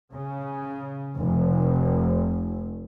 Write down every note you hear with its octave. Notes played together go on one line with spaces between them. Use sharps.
C#3
F1